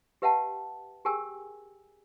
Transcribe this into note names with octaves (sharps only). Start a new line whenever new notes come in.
G4 B4 E5 F#5 G5 A5
G4 G#4 A#4 G5 G#5 E6